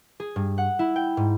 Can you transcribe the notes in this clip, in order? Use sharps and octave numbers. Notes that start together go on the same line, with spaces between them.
G#4
G2
F#5
E4
G5
G#2